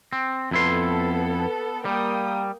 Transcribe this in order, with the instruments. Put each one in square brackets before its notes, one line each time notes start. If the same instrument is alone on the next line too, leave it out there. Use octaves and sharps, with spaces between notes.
[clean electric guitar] C4
[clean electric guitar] F2 E4 C6 [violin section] B3 A4
[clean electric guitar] G3 [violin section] A#3 G5 D#6